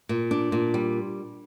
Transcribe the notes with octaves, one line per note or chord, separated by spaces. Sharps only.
A#2
D4
A#2
G3